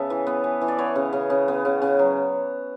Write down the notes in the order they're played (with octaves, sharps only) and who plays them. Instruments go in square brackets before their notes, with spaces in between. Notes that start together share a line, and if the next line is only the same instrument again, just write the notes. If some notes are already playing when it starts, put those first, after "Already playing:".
Already playing: [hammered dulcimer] C#3 B3 A4 E5
E3
B3
E3
E3
D5
B3 C#5
C#3
C#3
C#3
B3
C#3
C#3
F#3